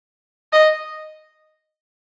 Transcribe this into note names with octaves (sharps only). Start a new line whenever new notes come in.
D#5